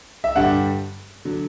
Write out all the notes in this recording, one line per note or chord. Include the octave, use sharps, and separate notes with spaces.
E5
G2 D3 G3 D4 F#5
D3 F#3